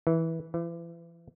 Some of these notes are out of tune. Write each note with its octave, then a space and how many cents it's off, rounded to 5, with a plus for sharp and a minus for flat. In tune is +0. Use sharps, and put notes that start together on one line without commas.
E3 -10
E3 +40